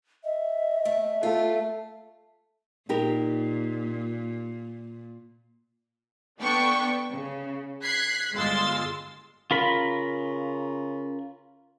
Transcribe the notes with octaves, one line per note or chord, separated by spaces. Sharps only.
D#5 E5
A3
A3 F4
A#2 D#4 G4 A#4
B3 D4 A4 G5 C#6
C#3
F#6 G#6 B6 C7
G1 G#3 F4 C6 E6 A6
C#3 F4 A#4 B5